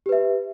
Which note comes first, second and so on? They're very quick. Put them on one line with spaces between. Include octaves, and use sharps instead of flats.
G4 B4 E5